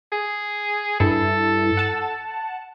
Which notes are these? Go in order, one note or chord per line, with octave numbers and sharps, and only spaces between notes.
G#4
G2 E4 A4
F#5 A5